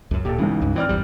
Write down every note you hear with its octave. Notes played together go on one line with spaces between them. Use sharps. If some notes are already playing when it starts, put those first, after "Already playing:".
C#2 F#2
D1 A#2 G4 A4
B1 G#2 C#3 E3
C#2 G2
E3 C4 D5 F6
G1 E2 G3